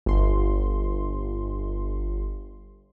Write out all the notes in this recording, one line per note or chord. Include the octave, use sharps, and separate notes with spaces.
G1 C6